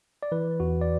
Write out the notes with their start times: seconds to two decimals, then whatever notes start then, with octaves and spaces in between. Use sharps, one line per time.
0.23 D5
0.32 E3 B4
0.60 E2 F#4
0.81 D5